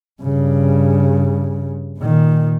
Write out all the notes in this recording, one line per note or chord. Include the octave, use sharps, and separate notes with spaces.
G2 C#3
A#2 D#3